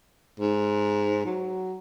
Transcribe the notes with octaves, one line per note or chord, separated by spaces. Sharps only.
G#2
F#3